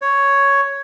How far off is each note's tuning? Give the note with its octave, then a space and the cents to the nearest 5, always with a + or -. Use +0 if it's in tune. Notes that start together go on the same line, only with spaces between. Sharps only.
C#5 +5